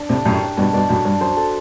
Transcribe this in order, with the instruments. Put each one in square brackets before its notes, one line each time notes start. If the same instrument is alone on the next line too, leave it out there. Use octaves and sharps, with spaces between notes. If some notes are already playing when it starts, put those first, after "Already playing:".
Already playing: [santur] D4
[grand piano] A2 C3 [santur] D5
[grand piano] F#2 A2 [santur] G4
[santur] D4
[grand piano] G2 B2 [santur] D4
[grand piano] G2 B2 [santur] D5
[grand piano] F#2 A2 [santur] F#4
[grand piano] G2 [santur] D4
[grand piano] F#2 [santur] C5
[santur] A4